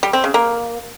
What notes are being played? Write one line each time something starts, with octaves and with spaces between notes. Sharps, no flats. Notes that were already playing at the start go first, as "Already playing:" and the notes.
G3
C4
C#3
A#3